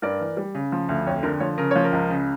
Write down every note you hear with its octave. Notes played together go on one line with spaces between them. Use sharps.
G2 A#4 D5
E3
G3
C#3
F3
D2
F2 C#5
D3 A#4
F3 C#5
C#3 A#4
F3 C#5
A#4
C#2
C#3